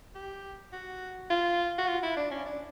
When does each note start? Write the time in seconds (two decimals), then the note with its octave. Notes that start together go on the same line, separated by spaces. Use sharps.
0.15 G4
0.73 F#4
1.30 F4
1.78 F#4
1.88 F4
2.03 E4
2.17 D4
2.31 C#4
2.46 D4